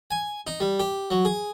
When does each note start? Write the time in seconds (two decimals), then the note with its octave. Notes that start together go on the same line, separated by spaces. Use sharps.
0.11 G#5
0.47 D#4
0.60 G3
0.80 G4
1.10 F#3
1.25 G#4